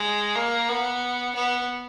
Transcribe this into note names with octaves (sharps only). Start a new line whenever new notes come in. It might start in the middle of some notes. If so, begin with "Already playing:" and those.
Already playing: G#3
A#3
B3
B3